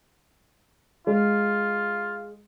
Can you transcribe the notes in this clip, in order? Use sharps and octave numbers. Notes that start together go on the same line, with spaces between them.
G#3 F4